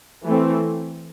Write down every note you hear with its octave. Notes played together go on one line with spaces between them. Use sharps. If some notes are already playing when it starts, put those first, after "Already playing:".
E3 A3 C4